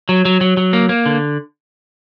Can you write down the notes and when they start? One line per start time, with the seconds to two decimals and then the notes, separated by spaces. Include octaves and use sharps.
0.09 F#3
0.25 F#3
0.41 F#3
0.57 F#3
0.73 A#3
0.89 A#3
1.06 D3